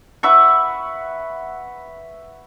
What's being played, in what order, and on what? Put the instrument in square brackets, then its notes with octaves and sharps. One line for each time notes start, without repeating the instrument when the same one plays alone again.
[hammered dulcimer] B4 E5 F#5 C#6